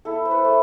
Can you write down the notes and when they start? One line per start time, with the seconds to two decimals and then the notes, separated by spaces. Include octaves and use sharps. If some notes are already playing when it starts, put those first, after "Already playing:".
0.05 E4 A4
0.25 C5
0.31 B4
0.45 A3